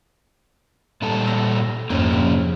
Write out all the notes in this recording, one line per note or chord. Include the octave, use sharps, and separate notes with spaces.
A#2 G3 A4
E6 A#6 C#7
A#1 F2 G#2 A#3 C#4
C3 F3